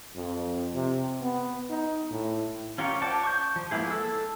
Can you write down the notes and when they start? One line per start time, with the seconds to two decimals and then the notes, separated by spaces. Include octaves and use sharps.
0.16 F2
0.74 C3
1.22 B3
1.70 D#4
2.10 A2
2.78 C#4 F4 G4 A#4 C#5
3.02 C5 D5 F#5 A5 D6
3.23 C#6 D6 G6
3.56 F3
3.71 G#3 A#3 B3 E4 G#4
3.91 A4 E6